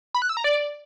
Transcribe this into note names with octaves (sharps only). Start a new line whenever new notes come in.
B5
F#6
E6
A#5
D5